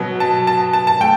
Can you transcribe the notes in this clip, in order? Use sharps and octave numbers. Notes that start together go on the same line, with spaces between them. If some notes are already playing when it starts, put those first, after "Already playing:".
Already playing: B2 F#3 B3
A5
A5
A5
A5
A3 G5